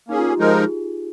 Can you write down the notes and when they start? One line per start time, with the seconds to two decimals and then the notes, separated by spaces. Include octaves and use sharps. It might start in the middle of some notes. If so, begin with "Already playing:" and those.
0.08 A#3 C#4 D#4 G#4
0.18 F4
0.29 G4
0.39 F3 G#3 D#4 G#4 A#4
0.55 G#4